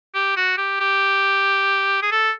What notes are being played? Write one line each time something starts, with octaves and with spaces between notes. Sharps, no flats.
G4
F#4
G4
G4
G#4
A4